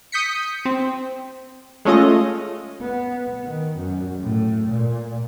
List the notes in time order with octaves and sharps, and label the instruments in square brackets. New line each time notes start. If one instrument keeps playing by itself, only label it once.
[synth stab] D#6 G6 B6 C#7
C4
G#3 A3 C#4 F4 D#5
[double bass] B3
D#3
F#2
A2
A#2